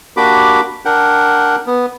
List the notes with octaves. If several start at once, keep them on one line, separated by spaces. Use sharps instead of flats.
A#3 D4 F#4 G4 B5 D6
D4 A#4 F#5 G5
B3